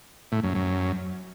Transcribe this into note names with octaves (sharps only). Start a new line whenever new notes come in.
A2
F#2
F#2